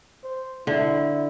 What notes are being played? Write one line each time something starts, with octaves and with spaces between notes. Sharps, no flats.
C5
D3 E4